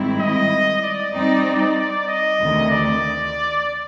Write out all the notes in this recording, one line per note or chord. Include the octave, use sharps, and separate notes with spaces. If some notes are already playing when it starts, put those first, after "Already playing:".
Already playing: G#2 D#3 G3 C4 E4
D#5
D5
G3 C4 D#4
D#5
D2 C3 D#3
D5